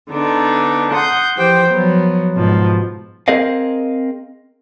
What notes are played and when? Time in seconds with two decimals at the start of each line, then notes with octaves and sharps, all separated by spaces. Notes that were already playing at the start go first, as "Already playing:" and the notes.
0.11 D3 B3 D4 D#4
0.92 F#5 C6 D#6 G6
1.35 E3 F3 G4 C5 G5
1.69 F3 F#3 B3
2.36 G#2 B2 F3
3.28 C4 G#4 A#4 D#5 F5